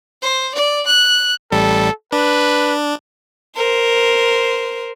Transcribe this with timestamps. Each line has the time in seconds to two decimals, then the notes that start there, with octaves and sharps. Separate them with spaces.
0.22 C5
0.55 D5
0.87 F#6
1.52 A1 G3 A4
2.12 D4 B4
3.56 A#4 C5